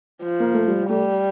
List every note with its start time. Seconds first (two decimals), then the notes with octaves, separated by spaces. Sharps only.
0.22 F3
0.40 A#3
0.54 A3
0.68 G3
0.89 G3 A3